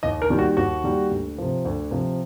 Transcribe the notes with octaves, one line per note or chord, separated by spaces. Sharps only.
D#2 D#5
A#4
D#3 G3 A#3
F#4
D#2 F#4
D#3 G3 A#3
D2
C3 F3
D2
C3 F3